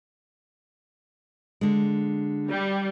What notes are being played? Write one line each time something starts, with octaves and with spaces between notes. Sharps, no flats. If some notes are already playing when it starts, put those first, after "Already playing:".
D3 G#3
G3